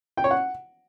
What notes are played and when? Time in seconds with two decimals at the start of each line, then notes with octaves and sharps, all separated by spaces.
0.17 G5
0.24 C#5
0.31 F#5